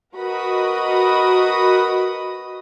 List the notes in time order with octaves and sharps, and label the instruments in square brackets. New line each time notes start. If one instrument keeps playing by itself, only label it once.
[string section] F#4 A#4 B4 D#5 B5 D#6